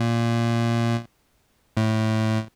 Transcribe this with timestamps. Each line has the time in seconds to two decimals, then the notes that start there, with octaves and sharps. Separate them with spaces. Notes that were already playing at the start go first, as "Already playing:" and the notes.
Already playing: A#2
1.77 A2